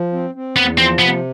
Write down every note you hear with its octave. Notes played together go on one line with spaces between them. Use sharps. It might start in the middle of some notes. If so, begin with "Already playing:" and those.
Already playing: F3
C4
C4
E2 B3
F3 C4
C3 B3